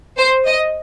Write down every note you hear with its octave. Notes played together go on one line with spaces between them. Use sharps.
C5
D#5